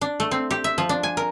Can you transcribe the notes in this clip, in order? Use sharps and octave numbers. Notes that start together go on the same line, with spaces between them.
D4
A3
C4
G4
E5
F3
D4
G#5
A#4